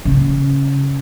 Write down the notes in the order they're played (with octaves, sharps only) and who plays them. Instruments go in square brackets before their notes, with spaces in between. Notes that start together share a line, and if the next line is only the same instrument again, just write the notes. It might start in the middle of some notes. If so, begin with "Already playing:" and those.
[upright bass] C#3